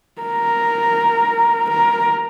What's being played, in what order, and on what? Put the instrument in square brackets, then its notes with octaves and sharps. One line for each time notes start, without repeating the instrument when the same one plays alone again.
[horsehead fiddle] A#4
A#4